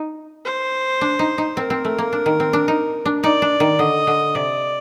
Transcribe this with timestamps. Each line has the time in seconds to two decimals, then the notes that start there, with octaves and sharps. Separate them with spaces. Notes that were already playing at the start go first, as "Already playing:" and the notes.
Already playing: D#4
0.45 C5
1.01 D4
1.19 D#4
1.38 D#4
1.56 C4 A#4
1.70 C4
1.85 A3
1.98 A#3
2.13 D4
2.26 D#3
2.40 C4
2.53 D4
2.68 D#4
3.06 D4
3.23 D#4 D5
3.42 D4
3.60 D#3
3.79 D3 D#5
4.07 D3
4.35 C3 D5